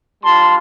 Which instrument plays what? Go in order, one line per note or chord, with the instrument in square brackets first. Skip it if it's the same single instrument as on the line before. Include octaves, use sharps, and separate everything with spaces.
[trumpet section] G3 D4 F4 A5 C6